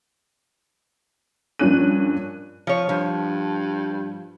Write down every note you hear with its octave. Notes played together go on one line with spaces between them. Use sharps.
G2 F3 A#3 C#4 F#6 D#7
F3 C#5
G2 F3